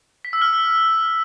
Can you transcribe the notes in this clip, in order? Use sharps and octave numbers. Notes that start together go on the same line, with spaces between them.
B6
E6
F6